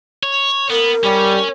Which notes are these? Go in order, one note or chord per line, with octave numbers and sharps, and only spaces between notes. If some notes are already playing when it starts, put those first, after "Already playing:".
C#5
B3 A#4
G3 C#4